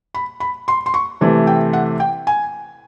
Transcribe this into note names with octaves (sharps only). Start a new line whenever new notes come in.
B5
B5
C6
C6
C#6
C3 E3 A3
G5
F#5
G5
G#5